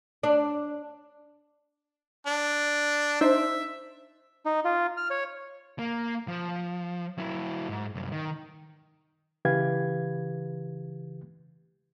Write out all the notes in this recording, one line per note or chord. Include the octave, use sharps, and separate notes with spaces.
D4
D4
D4 D#4 C5 E5
D#4
F4
F6
C#5
A#3
F3
F#3 E4
G#2
C2 F#2
D#3
C#3 E3 G4 B4 F5 G#6